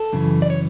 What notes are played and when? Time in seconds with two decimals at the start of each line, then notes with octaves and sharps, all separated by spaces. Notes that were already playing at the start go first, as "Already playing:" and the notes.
Already playing: A4
0.13 F#2 C#3 E3
0.42 D5
0.50 C#5